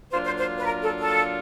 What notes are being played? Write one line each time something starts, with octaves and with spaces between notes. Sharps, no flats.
F#3 A#3 D4 F4 C5
C5
C5
B4
A#4
A4
A4